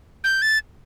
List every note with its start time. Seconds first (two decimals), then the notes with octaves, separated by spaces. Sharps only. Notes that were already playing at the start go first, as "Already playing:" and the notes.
0.24 G6
0.42 A6